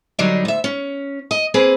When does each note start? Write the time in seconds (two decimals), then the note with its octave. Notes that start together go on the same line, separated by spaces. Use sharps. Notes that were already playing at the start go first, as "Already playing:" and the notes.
0.19 D3 F#3 G3 D4 D#4
0.45 D2 E5
0.64 C#4
1.31 D#5
1.54 A#3 C4 G#4 B4